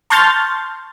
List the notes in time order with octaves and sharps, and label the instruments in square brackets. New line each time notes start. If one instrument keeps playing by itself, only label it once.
[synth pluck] A5 C6 C#6 F6 G6 A6